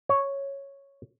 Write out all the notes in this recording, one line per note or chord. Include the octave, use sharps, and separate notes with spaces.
C#5